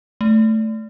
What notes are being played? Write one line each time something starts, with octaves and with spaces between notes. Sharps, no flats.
A3